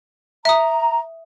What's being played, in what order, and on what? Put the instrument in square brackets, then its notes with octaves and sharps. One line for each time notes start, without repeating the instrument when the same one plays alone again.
[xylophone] E5 D#6 [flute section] A#5